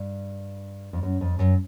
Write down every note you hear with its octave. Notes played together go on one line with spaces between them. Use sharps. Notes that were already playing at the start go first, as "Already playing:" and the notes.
Already playing: G2
F2
F#2
F2
F#2